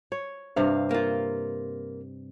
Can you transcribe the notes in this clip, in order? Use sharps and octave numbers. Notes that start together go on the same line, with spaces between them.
C#5
G2 C3 F5
A#3 F4